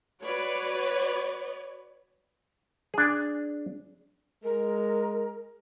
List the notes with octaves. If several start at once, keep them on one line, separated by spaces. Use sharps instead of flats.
F#4 B4 C#5 D5
D4 G#4
G#3 A#4